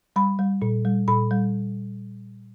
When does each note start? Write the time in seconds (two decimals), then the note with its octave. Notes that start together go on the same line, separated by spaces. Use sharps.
0.16 G3 B5
0.39 G3
0.62 A#2
0.85 G3
1.08 A#2 B5
1.31 G3